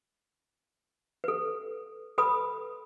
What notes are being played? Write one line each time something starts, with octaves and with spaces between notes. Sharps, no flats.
A4 B4
A4 B4 B5 D#6